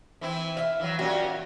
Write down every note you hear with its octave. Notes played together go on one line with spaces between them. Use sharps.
E3 C4 E4
E5 F5
E3 F#3
A#2 C#4 F#4 G4